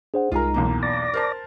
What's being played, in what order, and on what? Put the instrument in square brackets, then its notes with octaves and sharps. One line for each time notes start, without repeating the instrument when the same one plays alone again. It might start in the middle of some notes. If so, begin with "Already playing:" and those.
[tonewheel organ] D4 [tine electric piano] G#4 C5 F#5
[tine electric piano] C2 A#5 [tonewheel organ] G#3 D#4 [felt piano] F4 G#4 A#4
[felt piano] B1 E2 A#3
[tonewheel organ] D5 D6 A#6 [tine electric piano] A6
[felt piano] A#4 C5 A5